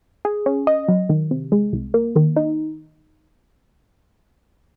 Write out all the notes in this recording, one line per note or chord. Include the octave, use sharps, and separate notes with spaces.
G#4
C#4
D#5
F#3
D#3
C3
G#3
C2
A#3
D#3
D#4